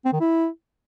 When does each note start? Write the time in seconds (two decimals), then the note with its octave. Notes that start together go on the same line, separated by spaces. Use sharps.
0.05 C4
0.13 D#3
0.20 E4